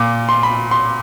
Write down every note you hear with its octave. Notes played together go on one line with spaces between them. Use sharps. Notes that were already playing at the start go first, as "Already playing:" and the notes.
Already playing: A#2 D6
C6
B5
C6